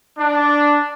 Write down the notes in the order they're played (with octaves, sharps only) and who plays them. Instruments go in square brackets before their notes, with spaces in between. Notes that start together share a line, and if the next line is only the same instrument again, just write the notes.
[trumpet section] D4